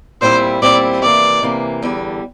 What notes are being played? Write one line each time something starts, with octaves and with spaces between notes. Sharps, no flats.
A#2 G3 C4 E4 C5
A#2 G3 C4 E4 D5
C3 E3 A#3 D5
C3 E3 A#3
E2 D3 G3